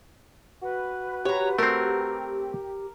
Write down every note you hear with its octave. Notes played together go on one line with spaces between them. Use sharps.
F#4 B4
G4 C#5 A#5
A3 C4 A#4